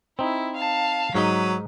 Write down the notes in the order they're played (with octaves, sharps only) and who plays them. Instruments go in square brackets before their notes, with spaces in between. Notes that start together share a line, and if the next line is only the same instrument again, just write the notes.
[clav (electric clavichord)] C4 D#4 [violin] E4
[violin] F5 A5
[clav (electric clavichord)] G#2 D#4 [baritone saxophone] F#3 [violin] B6 D#7